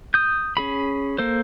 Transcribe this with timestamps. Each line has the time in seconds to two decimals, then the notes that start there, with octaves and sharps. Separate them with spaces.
0.14 D#6 G6
0.57 C#4 G#4 B5
1.18 A#3 A4 C5